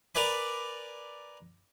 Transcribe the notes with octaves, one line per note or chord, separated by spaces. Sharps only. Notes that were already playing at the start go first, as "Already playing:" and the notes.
A#4 B4 D5 G#5 B5